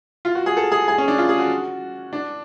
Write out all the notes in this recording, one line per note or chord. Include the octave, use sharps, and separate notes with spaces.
F4
F#4
G#4
A4
G#4
G#4
C#4
D4
F4
G#4
F#4
D4